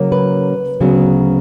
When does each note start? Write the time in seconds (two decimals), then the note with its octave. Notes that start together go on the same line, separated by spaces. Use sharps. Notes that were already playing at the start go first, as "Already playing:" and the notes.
Already playing: C#3 F#3 A#3 C#4
0.12 B4
0.80 D2 C#3 F#3 B3